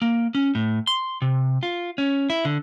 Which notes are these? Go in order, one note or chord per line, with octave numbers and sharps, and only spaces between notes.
A#3
C#4
A2
C6
C3
F4
C#4
E4
D3